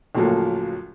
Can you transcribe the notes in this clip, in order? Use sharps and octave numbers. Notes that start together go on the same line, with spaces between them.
C#2 A2 F3 F#3 A#3 A4